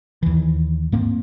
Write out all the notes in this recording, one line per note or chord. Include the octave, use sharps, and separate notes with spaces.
D#2 E3
G#2 A#3 C4